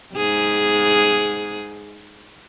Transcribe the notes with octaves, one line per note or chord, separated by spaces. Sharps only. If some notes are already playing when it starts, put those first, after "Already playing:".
G#2 G#4